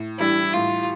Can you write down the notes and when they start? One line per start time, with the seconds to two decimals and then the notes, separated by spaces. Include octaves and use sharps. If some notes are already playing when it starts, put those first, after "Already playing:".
Already playing: A2
0.19 E3 G3 D4 E4
0.53 A2 F4